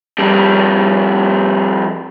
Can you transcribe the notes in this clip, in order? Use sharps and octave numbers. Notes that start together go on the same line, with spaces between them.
F2 G3